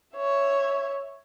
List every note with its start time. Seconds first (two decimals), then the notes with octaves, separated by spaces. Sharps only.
0.16 C#5 E5